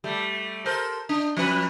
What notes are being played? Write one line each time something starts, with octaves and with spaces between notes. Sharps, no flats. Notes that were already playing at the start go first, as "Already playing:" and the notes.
G3 A3
A4 A#4 C5
D4
F3 C#4 B4